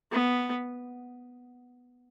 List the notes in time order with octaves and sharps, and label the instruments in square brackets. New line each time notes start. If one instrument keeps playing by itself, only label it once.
[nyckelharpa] B3